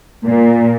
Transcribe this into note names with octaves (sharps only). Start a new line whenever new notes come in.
A#2